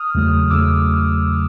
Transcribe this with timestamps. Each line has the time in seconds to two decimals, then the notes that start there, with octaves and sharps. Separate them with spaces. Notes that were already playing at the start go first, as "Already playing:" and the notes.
Already playing: D#6 F6
0.15 E2 C#3 F#3 A3
0.50 E2 C#3 F#3 A3 D6 E6